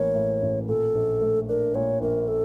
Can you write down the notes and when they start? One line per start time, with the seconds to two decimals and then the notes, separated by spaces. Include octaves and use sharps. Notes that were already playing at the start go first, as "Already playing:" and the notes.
Already playing: A1 A2 E3 A#3 C#5
0.15 A2
0.42 A1
0.68 A#2 A4
0.95 A#1
1.21 A3
1.49 D4 A#4
1.75 A#2 C#5
2.01 A#1 A#4
2.28 A4